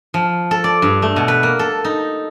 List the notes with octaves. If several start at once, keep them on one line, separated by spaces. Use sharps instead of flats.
F3
A4
D5
G2
A3
B2
B4
A#3
A4
D#4